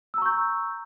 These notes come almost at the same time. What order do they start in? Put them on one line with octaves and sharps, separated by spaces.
E6 A#5 C#6 G6